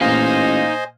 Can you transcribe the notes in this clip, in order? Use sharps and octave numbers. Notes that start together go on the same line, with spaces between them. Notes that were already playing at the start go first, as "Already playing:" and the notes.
A1 A#2 D#4 C5 D#5 F5 G#5